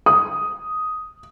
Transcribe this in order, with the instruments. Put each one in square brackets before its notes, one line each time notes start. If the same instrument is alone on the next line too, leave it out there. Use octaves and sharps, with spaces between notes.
[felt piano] D#6